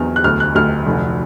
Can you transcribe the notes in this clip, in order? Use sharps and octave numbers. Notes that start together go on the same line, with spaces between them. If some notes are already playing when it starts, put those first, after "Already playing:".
Already playing: E2 F#3 F6
F#6
D2 F6
F#6
D2 F6
F1